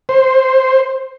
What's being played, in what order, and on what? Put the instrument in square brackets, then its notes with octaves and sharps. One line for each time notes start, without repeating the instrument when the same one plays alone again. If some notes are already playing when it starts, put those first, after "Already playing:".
[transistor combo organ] C5